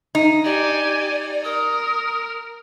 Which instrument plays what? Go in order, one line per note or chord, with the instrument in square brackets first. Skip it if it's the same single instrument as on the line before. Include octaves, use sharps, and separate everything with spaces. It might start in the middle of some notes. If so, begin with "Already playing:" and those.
[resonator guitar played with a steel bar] D#4
[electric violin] G4 G#5 [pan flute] D5
[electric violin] A#4 [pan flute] D#6